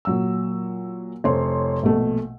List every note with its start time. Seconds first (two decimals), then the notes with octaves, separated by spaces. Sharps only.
0.05 A#2 F#3 E6
1.24 F1 C5 C#5 C6
1.83 A#1 B2 A3